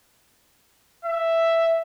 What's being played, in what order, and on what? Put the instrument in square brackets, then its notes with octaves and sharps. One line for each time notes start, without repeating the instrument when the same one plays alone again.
[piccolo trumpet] E5